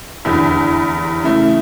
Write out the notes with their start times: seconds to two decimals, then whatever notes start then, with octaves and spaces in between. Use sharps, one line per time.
0.25 F1 E2 D3
1.23 C#3 E3 A3